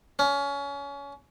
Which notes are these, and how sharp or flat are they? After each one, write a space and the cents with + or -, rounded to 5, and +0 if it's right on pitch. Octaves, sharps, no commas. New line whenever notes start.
C#4 +25